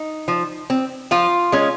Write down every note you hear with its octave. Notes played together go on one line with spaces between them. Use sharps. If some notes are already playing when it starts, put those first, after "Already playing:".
Already playing: D#4
F3
C4
F3 F4
G#3 C#4